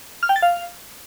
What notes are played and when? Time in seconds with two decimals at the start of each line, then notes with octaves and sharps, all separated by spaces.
0.23 F6
0.29 G5
0.36 A6
0.42 F5